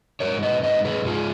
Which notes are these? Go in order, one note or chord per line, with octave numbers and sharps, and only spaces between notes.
G#2 A#4 C#5
B4 D#5
G#2 B4 D#5
G#4 B4
G#2 F4 G#4